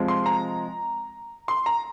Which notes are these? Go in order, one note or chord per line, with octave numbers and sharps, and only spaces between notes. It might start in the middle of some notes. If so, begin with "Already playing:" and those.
Already playing: C3 F3 G#3
C6
A#5
C6
A#5